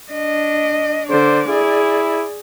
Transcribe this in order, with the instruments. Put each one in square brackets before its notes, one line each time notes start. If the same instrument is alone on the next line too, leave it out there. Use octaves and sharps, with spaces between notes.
[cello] D4 D#5
[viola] D3 [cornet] C5 [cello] D5
[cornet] E4 [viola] G#4